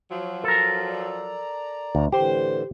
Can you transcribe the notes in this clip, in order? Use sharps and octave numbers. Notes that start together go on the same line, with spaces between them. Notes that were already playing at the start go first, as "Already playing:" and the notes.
F3 F#3
A4 A#4
D5 A#5
D2
A2 D3 E3 G4 C5